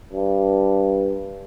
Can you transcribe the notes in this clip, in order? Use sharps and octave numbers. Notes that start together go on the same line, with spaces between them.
G2